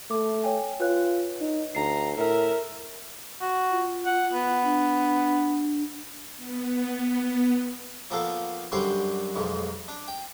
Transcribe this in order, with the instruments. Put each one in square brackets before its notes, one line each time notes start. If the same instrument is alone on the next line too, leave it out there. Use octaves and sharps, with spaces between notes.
[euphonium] A3 [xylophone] D6
[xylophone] C#5 G5 G#5
[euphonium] F4 [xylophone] B4 C#5 F#6
[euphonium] D#4
[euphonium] D2 [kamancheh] A#5 [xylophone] C7
[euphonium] A2 [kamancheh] A#4 E5
[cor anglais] F#4
[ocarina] F4
[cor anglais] F#5
B3
[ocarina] D4
[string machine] B3
[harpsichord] F3 A#3 B3 A4 F5
F#2 D3 F#3 G3 C5 C6
B1 F2 G#2
D4
G5